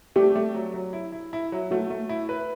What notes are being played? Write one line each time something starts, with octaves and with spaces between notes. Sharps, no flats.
A3 G4
A3
F#3
F#3
E4
E4
E4
F#3
A3 F#4
A3
E4
B4